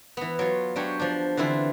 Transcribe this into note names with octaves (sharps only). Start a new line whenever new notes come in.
E3 B3
F#3 F4
F#3 D4 G4 C#5
F3 D4
D3 E3 C4 E4 F4